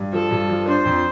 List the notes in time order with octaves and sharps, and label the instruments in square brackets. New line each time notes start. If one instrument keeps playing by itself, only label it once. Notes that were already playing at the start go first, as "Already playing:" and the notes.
Already playing: [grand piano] G2
[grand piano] F3 [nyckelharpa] A4
[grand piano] G2
F3
[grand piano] D4 [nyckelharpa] C5
[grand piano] F2